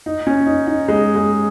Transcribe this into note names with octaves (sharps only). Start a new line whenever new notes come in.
D#4
C#4
D#4
D#4
G#3
G#3